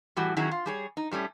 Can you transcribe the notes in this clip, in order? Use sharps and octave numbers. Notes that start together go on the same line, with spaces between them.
A2 E3 G3 F#4
D#3 F#3 C#4 E4 F#4 G#4
F4
G3 G#4 C#5
D#4
A2 G3 A3 C#4